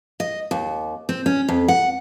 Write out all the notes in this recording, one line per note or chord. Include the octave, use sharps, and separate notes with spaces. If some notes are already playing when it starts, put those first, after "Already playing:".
D#5
D#2
C4
C#4
F2
F#5